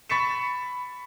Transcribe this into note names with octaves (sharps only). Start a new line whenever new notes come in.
B5 C#6 A6 B6 C#7 E7